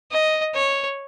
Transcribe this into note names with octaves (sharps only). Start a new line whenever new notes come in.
D#5
C#5